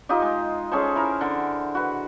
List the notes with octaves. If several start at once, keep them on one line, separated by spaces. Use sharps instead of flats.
D#4 F4 G4 D#5
G#3
C#4 G#4 A4 C5
E4 A#4
D3
F#4 B4